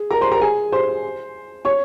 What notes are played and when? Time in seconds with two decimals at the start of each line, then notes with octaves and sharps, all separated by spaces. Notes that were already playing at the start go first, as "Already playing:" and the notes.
Already playing: G#4
0.11 A#4 A#5
0.21 C5 C6
0.31 A#4 A#5
0.41 G#4 G#5
0.72 C5 C6
1.65 C#5 C#6